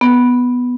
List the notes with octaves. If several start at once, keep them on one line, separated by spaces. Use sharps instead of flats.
B3